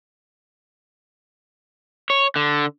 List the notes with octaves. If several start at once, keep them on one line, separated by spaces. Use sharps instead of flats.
C#5
D3